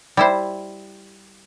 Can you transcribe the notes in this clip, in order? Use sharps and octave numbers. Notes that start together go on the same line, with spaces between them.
G3 E4 C5